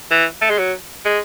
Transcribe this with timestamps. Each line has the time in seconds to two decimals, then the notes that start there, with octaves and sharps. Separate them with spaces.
0.11 E3
0.42 A3
0.50 G#3
0.58 F#3
1.05 G#3